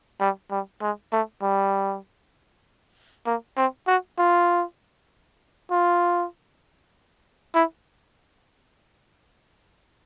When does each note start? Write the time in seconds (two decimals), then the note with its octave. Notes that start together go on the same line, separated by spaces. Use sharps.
0.20 G3
0.51 G3
0.82 G#3
1.12 A3
1.42 G3
3.26 A#3
3.57 C4
3.87 F#4
4.18 F4
5.71 F4
7.55 E4